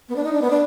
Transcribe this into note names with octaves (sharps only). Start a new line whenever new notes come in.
B3
D4
D#4
D4
B3
D4